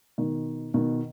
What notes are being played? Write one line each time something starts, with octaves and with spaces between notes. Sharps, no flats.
B2 D#3
B2 D#3